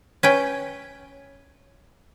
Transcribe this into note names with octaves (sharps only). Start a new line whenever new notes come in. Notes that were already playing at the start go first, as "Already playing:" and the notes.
C#4 B4 G5